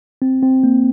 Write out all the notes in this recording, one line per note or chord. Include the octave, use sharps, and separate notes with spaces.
C4
C4
A#3